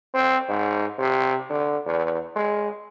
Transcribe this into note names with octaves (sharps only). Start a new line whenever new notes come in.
C4
G#2
C3
D3
E2
G#3